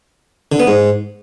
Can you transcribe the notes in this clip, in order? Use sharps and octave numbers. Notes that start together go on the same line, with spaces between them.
D3
B3
G#2